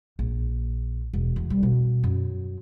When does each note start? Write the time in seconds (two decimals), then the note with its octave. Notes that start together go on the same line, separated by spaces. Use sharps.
0.19 A#1
1.13 E1
1.36 E2
1.50 G3
1.63 B2
2.04 F#2